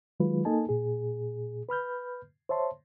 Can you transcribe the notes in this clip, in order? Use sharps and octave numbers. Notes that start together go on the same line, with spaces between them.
D#3 F#3 G#3 F4 B4
A#3 D#4 A4 D#5 G#5 A5
A#2 G#4
B4 B5 F6 G6
C5 C#5 E5 A5 C6